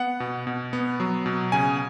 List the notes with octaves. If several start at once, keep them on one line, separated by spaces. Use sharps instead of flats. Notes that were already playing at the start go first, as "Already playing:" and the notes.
Already playing: B3 F#5
B2
B2
B3
F#3
B2
C#3 G#5